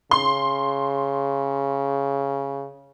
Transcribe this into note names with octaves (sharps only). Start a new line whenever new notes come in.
C#3 C6